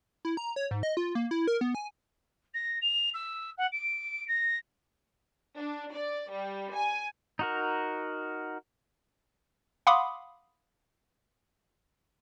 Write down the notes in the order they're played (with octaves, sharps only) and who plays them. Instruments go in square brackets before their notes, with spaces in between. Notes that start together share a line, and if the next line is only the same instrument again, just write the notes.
[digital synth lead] E4
A#5
C#5
G#2
D#5
F4
A#3
E4
A#4
B3
G#5
[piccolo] A#6
F7
E6
F#5
D7
A#6
[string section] D4
D5
G3
G#5
[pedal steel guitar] D#4 F#4 A#4
[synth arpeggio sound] F5 F#5 B5 C6 D6 D#6